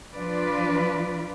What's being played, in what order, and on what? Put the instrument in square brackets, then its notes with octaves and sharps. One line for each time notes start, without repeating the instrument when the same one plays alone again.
[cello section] F3 D4 F4 B4 D5